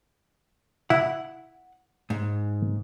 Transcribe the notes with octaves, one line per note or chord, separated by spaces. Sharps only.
E4 F#5
G#2